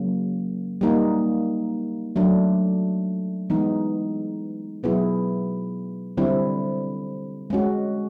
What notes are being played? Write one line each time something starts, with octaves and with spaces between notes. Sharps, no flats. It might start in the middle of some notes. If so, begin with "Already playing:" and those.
Already playing: C#3 F#3 A#3
G3 A#3 D#4
F#3 A3 D4
E3 G#3 B3 D#4
B2 F#3 B3 E4 G#4
D3 G3 C4 E4
G#3 C#4 F#4